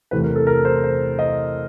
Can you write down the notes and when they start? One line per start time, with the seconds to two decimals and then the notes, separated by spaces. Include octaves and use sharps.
0.11 E2 C3 E3 A3 B4
0.24 A#4
0.36 A4
0.47 A#4
0.65 C5
0.84 C5
1.19 D#5